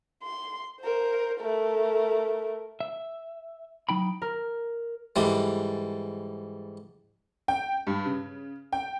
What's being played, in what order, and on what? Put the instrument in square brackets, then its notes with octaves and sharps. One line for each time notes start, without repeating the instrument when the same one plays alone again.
[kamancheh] C6
A#4 C5
A3 A#4
[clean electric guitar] E5
F#3 D#4 G5 B5
[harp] A#4
[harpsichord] G#2 D3 E3 G3
[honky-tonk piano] G5
G2
C#3
G5